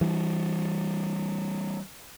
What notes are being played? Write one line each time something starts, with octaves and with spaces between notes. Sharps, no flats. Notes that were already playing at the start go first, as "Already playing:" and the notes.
E3 G3